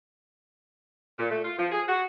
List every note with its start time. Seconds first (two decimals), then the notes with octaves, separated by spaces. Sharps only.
1.19 A#2
1.31 A3
1.45 F4
1.59 F3
1.71 G#4
1.88 F#4